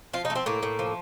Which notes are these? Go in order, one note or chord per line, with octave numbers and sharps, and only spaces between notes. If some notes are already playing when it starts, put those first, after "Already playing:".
F3 F4
D#4
A3
C4
A2 A#3
A2
F3